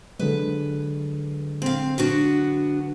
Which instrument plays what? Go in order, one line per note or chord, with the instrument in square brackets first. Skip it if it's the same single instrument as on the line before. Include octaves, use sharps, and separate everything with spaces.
[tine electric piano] D3 F#3 G#3 [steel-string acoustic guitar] B4
[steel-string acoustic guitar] C4 F5
B3 D4 F#4